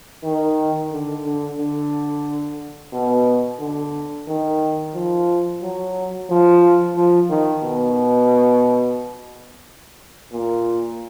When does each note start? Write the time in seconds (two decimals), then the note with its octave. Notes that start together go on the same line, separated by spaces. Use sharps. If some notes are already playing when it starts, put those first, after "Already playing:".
0.24 D#3
0.92 D3
1.25 D3
1.59 D3
2.93 B2
3.60 D3
4.28 D#3
4.95 F3
5.62 F#3
6.30 F3
6.96 F3
7.30 D#3
7.64 B2
10.33 A#2